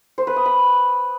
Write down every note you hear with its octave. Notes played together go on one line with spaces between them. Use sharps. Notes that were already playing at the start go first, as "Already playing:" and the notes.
C5
B4
D#6
B5